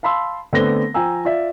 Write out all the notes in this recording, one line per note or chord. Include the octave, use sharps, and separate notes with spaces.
F5 A5 B5 C6 E6
D3 A3 B3 C4 A#6 G7
F3 G5 G#5 A#5 E6
F4 D5 E5